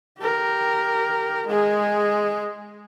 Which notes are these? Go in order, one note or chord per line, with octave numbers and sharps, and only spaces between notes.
G4 A#4
G#3 G#4